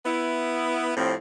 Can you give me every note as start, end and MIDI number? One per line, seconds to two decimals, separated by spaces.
0.06 0.92 59
0.06 0.92 64
0.97 1.14 45
0.97 1.14 53
0.97 1.14 55
0.97 1.14 60